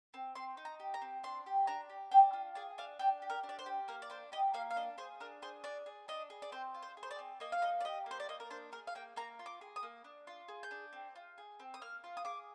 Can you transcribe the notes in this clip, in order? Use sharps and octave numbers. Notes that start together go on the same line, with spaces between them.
C4
C4 C6
D#4
A#5
G4
A#5
C4
D4 C6
G4
D4 A#5
G4
D4 G5
F4
G#4 D5
D4 F5
D4 G5
G4
A#4
D4
D5
C5
G4
A#3 A#4
D5
D4 C5
G4 D#5
A#3 F5
F5
D4 D#5
G#4 C5
D4 A#4
G#4 C5
D4 D5
G#4
D4 D#5
G#4
D5
C4 C5
F4
C5
G#4
C5
D5
C4
A#3 D#5
F5
D#4 D#5
D5
G4 D#5
A#3 C5
D5
A#3 D#5
A#4
D4 C5
G#4 A#4
F5
A#3 G5
A#3 A#5
F4
D6
G#4
D#6
A#3
D4
F4
G#4
G6
D4
C4
F4
G#4
C4
D#6
A#3 F6
F4
D#6
G#4 D6